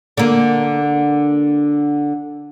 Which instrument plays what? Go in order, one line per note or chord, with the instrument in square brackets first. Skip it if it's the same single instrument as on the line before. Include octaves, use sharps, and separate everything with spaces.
[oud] D3 A#3